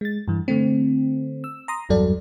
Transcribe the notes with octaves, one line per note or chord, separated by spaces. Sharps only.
G#3 A6
G2 E3
D3 A3 C4
E6
A#5 C6 D#6
G#1 E2 G2 F#3 A4 D5